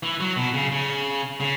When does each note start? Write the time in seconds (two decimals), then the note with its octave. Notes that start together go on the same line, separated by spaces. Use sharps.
0.03 E3
0.20 F#3
0.37 B2
0.54 C#3
0.72 C#3
1.40 C#3